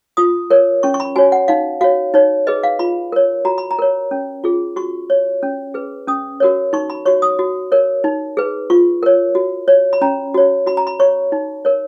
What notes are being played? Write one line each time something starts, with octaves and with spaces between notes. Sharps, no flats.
F4 D#6
A#4 C#5
C#4 C#6
C#6
B5
F#4 C#5 G#5
F#5
D#4 F5
F#4 C#5 F5
D#4 C#5
G#4 B4 D#5
F5
F4 B5
A#4 C#5
F#4 A#5
B5
A#5
A#4 C#5
C#4
F4 G#4
F#4 C#6
C#5
C#4
G#4 B4
C#4 D#6
F#4 A#4 C#5
D#4 C#6
B5
F#4 C#5 C#6
D#6
F#4
A#4 C#5
D#4
G#4 B4
F4 C#6
A#4 C#5
F#4
C#5
B5
C#4 A#5
F#4 C#5
F#4 B5
A#5
B5
C#5 C#6
D#4
A#4 C#5